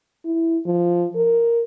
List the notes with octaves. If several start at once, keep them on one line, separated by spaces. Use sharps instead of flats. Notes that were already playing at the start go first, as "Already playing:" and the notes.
E4
F3
A#4